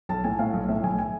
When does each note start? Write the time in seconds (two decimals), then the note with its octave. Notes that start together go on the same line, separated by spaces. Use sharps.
0.09 B1 A5
0.24 A2 G#5
0.39 A2 F5
0.53 B1
0.69 A2 E5
0.83 B1 G#5
0.98 G#5